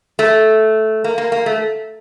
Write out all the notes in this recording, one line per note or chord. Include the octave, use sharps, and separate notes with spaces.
A3
A#3
A#3
A#3
A3